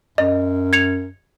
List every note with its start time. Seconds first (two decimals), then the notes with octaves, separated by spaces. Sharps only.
0.18 F#2 D#5
0.73 G#6 C#7 F7